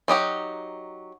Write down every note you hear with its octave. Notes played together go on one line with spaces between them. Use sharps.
F#3 D#4 G4 F#5